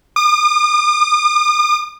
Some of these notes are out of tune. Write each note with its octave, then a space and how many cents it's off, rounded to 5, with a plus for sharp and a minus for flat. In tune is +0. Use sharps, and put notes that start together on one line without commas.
D#6 -45